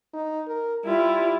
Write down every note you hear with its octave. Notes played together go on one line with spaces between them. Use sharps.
D#4
A#4
G3 E4 F4